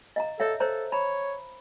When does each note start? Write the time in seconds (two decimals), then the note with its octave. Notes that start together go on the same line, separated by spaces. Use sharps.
0.16 D#5 F5 A#5
0.40 A4 C#5 E5 F5
0.60 A4 C5 C#5 A#5
0.92 C#5 A#5 B5